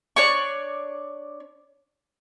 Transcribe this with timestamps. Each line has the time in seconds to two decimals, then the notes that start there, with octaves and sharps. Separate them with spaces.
0.16 D4 C#5 D5 C#6